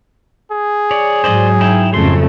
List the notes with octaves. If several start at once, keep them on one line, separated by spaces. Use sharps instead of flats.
G#4
C#5 D5
G#2 F#3 C5 D5 D#5
D#4 E4 G5
F2 C#3 A3 G#4 C6